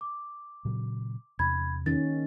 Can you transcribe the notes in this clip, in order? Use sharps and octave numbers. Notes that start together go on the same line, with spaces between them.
D6
A#2 C#3 F#3
E2 C3 B5 G#6
D#3 C#4 A6